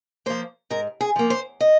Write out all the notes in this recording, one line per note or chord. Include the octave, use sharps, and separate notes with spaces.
F3 A#3 C5
G#2 A#4
G#4
F3 A#3
C5
D#5